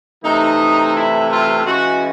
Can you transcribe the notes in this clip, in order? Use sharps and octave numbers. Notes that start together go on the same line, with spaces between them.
C3 E3 A3 D#4
E4
F4
C#3 E3 G#3 F#4